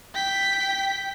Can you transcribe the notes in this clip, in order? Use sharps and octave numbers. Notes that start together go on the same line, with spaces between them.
G5 B6